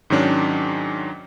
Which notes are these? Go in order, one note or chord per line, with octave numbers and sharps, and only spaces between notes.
G#2 D#3 F#3 C#4 D4